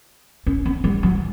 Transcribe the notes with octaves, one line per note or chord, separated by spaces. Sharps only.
C#4
C4
G3
F#3